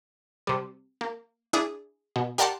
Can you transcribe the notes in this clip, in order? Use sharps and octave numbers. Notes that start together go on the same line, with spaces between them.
C3 G3
A#3
D4 E4 G#4
B2
G4 A#4 D5 F#5 A5 C6